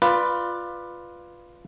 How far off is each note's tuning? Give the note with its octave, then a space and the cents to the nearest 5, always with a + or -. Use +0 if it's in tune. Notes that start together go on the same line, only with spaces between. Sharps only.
F4 +0 B4 +0 D5 +20